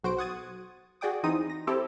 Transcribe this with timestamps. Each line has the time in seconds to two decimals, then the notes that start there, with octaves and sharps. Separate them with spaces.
0.04 B1 F#4 C5 D7
0.18 F#5 D#6 G#6 A6 D#7
1.01 F#4 G#4 D5 G5 D6 D#6
1.23 E2 E3 C4 D#4 D#6 D#7
1.50 A#6
1.67 C4 E4 G4 A4